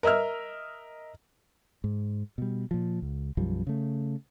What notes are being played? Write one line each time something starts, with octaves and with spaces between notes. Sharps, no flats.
A#4 D#5 E5 E6 F6
G#2
B2 G3
A#2 F3
C#2
B1 F#2 F3 G3
C#3 A3